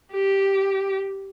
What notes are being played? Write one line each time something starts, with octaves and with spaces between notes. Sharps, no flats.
G4